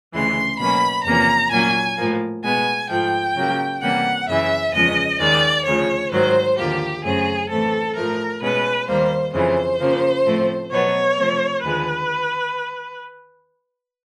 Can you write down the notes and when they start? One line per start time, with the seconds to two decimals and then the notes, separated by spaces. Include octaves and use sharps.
0.14 D2 C#3 E3 G#3 C6
0.59 B2 F#3 A#3 C#4 B5
1.06 E2 C3 F3 A#3 C#4 A#5
1.52 A#2 F#3 A#3 C#4 G#5
1.98 A2 F3 A#3
2.44 B2 G#3 B3 G#5
2.89 G#2 F3 A3 G5
3.36 C#3 F#3 A#3
3.82 C3 E3 G3 A#3 C#4 F#5
4.28 F#2 C#3 E3 E5
4.74 E2 C#3 F3 G#3 C#4 D#5
5.20 D#2 D#3 G#3 D5
5.66 D2 C#3 F3 C#5
6.12 G#2 D#3 F#3 C5
6.58 D#2 D3 F3 A#3 G4
7.04 F#2 C#3 F#3 A3 C4 G#4
7.50 A2 E3 A3 C4 A4
7.96 A2 F3 A3 A#4
8.42 B2 G#3 C#4 B4
8.88 D#2 D#3 G3 A#3 C5
9.34 F2 C#3 E3 C5
9.80 C#3 F3 A#3
10.26 A2 F3 A3 C4
10.72 B2 F#3 B3 C#5
11.18 C3 F3 A3 C4
11.64 D#2 D3 F3 G#3 B4